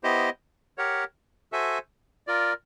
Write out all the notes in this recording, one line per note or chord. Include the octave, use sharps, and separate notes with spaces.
B3 E4 G4 C5 D#5
G4 A#4 C#5 F#5
F#4 A4 C5 E5 G#5
F4 A#4 D5